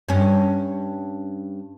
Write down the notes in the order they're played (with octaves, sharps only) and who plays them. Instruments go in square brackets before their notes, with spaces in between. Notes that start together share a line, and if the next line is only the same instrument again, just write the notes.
[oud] G2 C#4